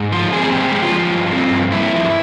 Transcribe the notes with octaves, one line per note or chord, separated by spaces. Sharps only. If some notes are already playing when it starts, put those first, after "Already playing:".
Already playing: G#2
F3 F4
C4 G#4
G#4
G#3 G4
G#3
F4
F3
G2
C4
G2
G2 E4
F3